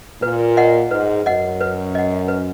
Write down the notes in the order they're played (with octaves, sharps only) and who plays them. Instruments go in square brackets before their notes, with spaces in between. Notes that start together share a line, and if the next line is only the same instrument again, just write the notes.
[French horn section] A#2 [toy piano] B4
[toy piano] D#5 F#5
[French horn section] G#2 [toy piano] B4
[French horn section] F#2 [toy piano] D#5 F#5
[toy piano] B4
D#5 F#5
B4